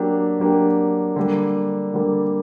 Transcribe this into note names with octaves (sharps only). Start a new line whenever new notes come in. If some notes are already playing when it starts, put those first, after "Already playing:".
Already playing: F#3 A#3 D4 G4
F#3 A#3 D4 G4
D3 G3 A#3
D3 G3 A#3